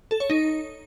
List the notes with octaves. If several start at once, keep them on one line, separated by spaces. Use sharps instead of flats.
A4
C#5
D#4